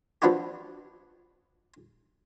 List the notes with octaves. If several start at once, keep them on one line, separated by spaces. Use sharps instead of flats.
F3 B3 D4 E4 F#4 G4